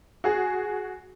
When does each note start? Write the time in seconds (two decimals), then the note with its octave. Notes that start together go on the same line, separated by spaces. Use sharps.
0.24 F#4 G#4